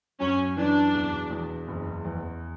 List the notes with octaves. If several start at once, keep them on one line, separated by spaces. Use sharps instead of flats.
F#2 C#4
E3 D4
E1
E2
F#1
E2